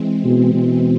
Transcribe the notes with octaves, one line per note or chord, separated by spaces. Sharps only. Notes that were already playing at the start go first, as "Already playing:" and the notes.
Already playing: E3 G#3 C4
B2
B2